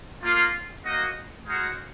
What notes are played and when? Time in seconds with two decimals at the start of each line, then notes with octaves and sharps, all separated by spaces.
0.22 A#3 F4
0.84 A#3 D#4 F#4 D#5
1.45 G#3 D#4 F#4 F5